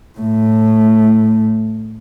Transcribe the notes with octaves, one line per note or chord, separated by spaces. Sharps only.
A2 A3